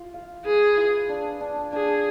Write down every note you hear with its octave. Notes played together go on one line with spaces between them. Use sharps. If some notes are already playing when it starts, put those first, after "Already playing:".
Already playing: F4
F5
G#4 B4
F4
D4
D4
D4 G#4